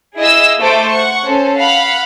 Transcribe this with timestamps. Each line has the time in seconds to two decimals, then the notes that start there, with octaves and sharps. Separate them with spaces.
0.18 E4 G#4 D#5 F5 E6
0.59 A3 C5 D6
0.92 F#5 C#6
1.25 C#4 A4 C5
1.56 F5 F#5 B5